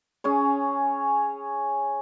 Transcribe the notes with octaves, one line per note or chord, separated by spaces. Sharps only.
C#4 G#4 C#5